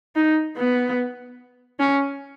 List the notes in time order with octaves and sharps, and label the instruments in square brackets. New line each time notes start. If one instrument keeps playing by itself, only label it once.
[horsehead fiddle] D#4
B3
C#4